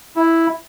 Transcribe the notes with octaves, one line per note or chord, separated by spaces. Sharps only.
E4